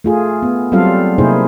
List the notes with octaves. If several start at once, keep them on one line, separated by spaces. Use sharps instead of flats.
A3 F4 G#4
B3
F#3 G3 C4 F4 A4 F5
C3 A#3 D#4 E4 G#4 C5